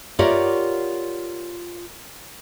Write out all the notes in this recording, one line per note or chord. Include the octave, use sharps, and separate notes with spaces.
F4 G4 A#4 C#5 D5 F#5